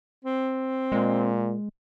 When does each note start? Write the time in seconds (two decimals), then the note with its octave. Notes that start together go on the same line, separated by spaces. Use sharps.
0.25 C4
0.92 A#2 G#3